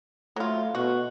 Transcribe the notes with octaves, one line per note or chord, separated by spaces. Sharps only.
F#3 A3 F4
B2 F#4